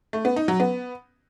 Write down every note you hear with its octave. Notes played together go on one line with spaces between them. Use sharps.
A3
B3
D#4
F#3
B3